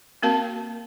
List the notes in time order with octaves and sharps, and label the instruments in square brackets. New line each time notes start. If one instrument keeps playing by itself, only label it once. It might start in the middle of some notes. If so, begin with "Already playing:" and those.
[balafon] A#3 C4 F#4 A#4 F5 A5